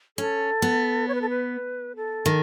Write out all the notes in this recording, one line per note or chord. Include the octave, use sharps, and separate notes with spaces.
C#4 A4
B3
C#5
B4
A4
B4
A4
D#3